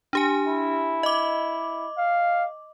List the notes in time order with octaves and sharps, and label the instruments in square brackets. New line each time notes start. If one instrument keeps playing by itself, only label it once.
[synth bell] D4 G4 G#5
[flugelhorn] E4
[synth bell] D#5 D6
[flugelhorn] F5